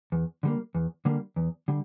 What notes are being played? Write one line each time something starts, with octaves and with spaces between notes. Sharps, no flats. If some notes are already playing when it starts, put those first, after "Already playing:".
E2
D3 G3 A#3
E2
D3 G3 A#3
E2
D3 G3